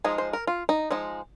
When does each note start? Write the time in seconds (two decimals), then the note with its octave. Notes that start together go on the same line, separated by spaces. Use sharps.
0.04 F3 G#3 D#4 G#4
0.18 C5
0.33 A#4
0.47 F4
0.69 D#4
0.91 F3 G#3 D#4